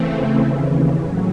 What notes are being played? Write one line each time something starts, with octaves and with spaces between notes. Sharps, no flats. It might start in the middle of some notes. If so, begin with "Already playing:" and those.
Already playing: C#3 E3 A3 C4
D#2 C#3 E3
A2 F#3